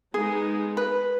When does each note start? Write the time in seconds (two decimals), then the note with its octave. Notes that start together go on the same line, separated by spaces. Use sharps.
0.14 G#3 B3 D#4 G#4
0.77 B4